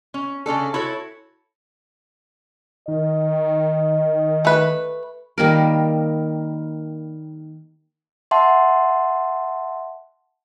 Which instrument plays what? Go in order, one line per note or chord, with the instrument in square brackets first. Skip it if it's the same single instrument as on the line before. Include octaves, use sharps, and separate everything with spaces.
[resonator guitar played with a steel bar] C#4
C#3 C#4 D4 A4
E4 F#4 A4 C#5
[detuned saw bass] D#3 [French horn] D#5
[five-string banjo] A3 B4
[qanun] D#3 G3 A#3 A#4
[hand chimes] E5 F#5 A5 C6